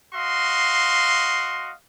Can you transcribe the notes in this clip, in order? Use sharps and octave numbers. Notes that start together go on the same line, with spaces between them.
F#4 D#5 F5 C6